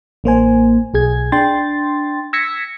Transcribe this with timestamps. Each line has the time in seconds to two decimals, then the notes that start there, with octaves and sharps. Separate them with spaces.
0.24 A1 A#3 C5 G#5
0.94 B1 G#4 G#6
1.32 D4 G5 C6 A6
2.33 E6 G#6 A#6 B6 C#7